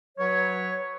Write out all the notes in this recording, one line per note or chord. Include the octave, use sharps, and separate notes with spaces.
F#3 B4 C#5